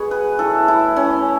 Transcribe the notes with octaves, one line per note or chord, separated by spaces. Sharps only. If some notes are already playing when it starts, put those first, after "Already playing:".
Already playing: B2 G#3 B3 F#4 G#4
B4
A2 E3 A3 A4
E4
C#4